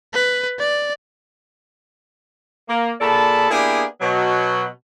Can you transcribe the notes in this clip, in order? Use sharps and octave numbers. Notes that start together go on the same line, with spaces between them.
B4
D5
A#3
A#2 G#4 A4 D5 A5 B5
A#3 B3 D4 E4 G4 G#4
B2 F#3